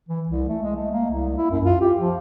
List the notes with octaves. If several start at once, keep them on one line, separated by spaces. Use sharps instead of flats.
E3
C2
A3
G#3
A3
A#3
C2
E4
F#2
F4
G4
F3